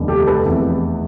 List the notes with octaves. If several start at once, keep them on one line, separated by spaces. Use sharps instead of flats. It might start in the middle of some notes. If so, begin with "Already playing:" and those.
Already playing: F1 D#2 D3 G3 B3
G4 A4
A4 B4
F1 E2 C3 E3